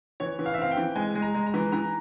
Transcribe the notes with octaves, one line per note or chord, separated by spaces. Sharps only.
E3 C#5
E3
F5
E5
C4 F5
G5
E3
G#3 G#5
G#3
A#5
G#3
A#5
E3
E3 A#5